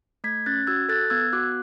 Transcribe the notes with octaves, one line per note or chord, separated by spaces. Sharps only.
A3 G#6 B6
C#4 F#6 A6
F#4 E6 G#6
A4 F#6 A6
B3 E6 G#6
F#4 D6 F#6